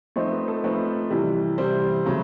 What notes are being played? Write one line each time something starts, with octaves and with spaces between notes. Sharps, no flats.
F3 A3 C4 D#4 C5
B4
A4
F3 A3 C4 D#4 B4
C3 E3 G3
C3 E3 G3 C5
C#3 F#3 A3